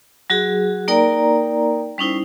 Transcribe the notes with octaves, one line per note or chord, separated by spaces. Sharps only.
F#3 F#4 G#4
A#3 D#4 A#4 D5 G5 A#5
G3 C#4 D#4 E4 C5